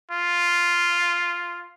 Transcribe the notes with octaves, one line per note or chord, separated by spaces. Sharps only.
F4